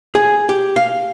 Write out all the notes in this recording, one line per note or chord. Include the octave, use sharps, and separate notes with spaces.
G#4
G4
F5